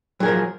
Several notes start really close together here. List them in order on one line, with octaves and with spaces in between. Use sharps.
F#3 G#4 A#4 F3